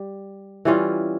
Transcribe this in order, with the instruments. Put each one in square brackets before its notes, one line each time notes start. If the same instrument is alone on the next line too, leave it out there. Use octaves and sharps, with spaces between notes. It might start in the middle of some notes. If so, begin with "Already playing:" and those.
Already playing: [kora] G3
E3 G3 C#4 F4